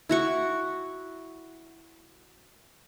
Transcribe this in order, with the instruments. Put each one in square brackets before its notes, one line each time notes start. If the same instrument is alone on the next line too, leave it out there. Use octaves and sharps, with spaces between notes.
[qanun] E4 F#4 C#6